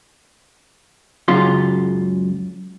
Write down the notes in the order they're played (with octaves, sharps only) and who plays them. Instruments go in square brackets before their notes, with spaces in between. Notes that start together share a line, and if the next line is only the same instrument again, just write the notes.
[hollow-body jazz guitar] C#2 F#2 C#3 F#3 F4 C6